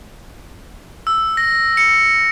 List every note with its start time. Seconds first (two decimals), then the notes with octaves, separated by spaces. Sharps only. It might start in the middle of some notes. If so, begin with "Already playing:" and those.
1.07 E6
1.37 A#6
1.77 C#7